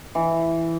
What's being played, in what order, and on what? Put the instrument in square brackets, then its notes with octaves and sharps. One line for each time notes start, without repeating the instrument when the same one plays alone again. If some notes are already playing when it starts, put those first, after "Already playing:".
[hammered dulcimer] E3